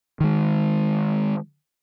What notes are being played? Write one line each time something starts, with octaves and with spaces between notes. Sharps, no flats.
D#3 G#3